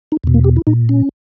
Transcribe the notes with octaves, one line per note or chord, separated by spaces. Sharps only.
D#4
E2 B2
A#3
G4
E4
A#2 D#4
C#4